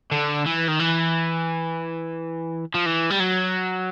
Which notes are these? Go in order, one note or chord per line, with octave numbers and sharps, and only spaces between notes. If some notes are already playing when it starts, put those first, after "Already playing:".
D3
E3
D#3
E3
F3
E3
G3
F#3